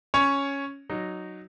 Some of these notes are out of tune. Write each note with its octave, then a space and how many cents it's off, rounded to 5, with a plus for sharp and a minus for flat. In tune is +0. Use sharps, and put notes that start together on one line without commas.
C#4 +0 C#5 +0
F#3 +0 D#4 -15